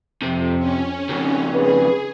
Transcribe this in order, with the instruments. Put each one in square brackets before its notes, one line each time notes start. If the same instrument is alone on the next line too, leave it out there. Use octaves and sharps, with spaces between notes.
[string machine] F2 [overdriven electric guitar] C3
[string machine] C#4
[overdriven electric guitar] F2 C#3
[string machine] G#4 [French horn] B4